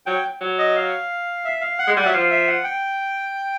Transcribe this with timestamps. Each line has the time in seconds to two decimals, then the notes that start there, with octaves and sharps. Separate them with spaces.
0.06 F#3 G5
0.41 F#3
0.58 D#5
0.76 F5
1.45 E5
1.61 F5
1.79 F#5
1.87 G#3
1.96 G3 F#5
2.05 F#3 E5
2.13 F3 F5
2.30 E5
2.48 F#5
2.64 G5